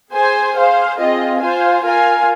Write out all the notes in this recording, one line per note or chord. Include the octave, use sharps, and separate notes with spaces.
G#4 C5 G#5
G#4 C5 F5
C4 F4 G#4 D#5
F4 C5 F5 G#5
F4 A#4 F5 G#5